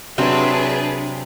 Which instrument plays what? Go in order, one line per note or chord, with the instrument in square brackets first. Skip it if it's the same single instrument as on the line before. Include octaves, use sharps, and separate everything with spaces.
[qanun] C3 F#3 C4 [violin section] D4 G#4 B4